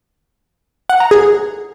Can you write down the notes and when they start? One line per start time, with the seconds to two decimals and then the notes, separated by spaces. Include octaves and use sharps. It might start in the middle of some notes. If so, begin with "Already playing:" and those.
0.90 F#5
1.00 A#5
1.11 G#4